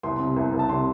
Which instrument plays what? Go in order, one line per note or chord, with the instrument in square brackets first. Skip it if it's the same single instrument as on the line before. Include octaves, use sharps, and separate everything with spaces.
[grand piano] C2 C6
C3
C2
C2
A5
C3 C6